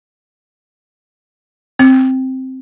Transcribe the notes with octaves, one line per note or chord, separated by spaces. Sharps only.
C4